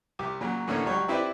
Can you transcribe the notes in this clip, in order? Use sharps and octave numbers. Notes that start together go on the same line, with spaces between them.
C2 G4 D6
A#2 C#3 F#3
A2 D3 E3 A3 A#3 C#4
C#2 F#3 G3 C#5
C4 E4 G4 B4 C5 D5